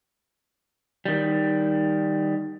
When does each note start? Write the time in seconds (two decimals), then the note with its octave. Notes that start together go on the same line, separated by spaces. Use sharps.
1.06 D#3 G3